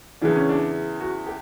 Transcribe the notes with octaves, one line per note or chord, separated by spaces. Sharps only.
E2 C#3 E3 D4
C#4
D4
F#4
G4